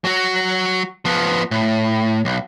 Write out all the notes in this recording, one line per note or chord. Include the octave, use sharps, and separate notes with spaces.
F#3 F#4
F3 B3
A2
B1